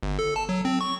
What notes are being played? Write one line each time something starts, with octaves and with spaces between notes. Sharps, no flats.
G1
A4
A5
F#3
C4
C#6